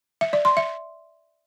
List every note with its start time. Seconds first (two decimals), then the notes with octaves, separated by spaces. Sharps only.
0.21 E5
0.33 D5
0.45 C6
0.57 E5